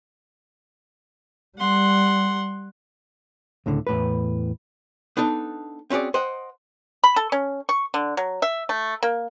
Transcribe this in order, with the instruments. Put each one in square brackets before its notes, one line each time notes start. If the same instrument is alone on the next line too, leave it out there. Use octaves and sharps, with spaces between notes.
[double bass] G3 [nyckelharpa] F#5 C6
[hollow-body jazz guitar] C#2 A2 D3
E2 A2 B4
B3 D4 D#4 A4
C4 C#4 F#4 G#4 D5
C5 D#5 F#5 G5
[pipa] B5
A4
C#4
C#6
D3
F#3
E5
A3
A#3